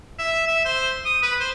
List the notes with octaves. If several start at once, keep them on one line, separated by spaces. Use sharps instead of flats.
E5
E5
C5
D#6
B4
C5